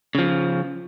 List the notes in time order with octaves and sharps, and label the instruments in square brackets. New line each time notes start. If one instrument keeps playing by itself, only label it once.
[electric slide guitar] C#3 F3